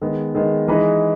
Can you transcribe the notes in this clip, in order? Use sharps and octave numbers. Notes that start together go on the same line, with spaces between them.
D#3 G#3 B3
D#3 G#3 B3
E3 G#3 D#4 G#4 B4